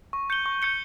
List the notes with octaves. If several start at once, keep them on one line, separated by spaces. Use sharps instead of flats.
C#6
G6 C#7 G7
C#6
G6 C#7 G7